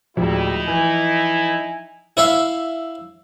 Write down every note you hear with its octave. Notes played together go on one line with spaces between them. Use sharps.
D1 F3 G3 G#3 D#4 E4
E3 G#5
E4 C#5 E5 F5